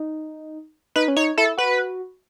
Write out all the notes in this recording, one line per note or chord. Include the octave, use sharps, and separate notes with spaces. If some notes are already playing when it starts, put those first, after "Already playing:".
Already playing: D#4
D#4 B4
C#4
D#4 C#5
E4 A4
F#4 B4